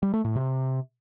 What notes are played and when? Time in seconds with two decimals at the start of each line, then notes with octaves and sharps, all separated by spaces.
0.03 G3
0.14 A3
0.25 A2
0.35 C3